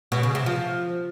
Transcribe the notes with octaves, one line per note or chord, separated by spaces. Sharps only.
B2
C#3
C3
F3